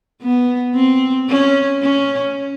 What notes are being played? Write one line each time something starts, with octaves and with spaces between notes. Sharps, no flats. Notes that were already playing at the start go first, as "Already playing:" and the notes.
B3
C4
C#4
C#4